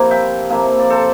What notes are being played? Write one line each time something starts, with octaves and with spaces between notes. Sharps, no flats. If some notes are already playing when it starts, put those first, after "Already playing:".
Already playing: C3 F3 A#3 E4 A#5
E5 G5
C3 F3 A#3 E4
D5
A4 C5